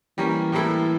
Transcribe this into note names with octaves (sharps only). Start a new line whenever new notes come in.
E3 G3 A#3 C#4
A2 G3 A#3 E4 A4